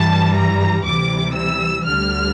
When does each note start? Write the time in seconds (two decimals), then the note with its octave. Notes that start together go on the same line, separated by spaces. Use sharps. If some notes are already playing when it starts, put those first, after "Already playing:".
Already playing: G2 E3 G3 A5
0.35 A#5
0.85 D2 C3 E3 G3 D6
1.35 E6
1.85 D2 D3 G3 F6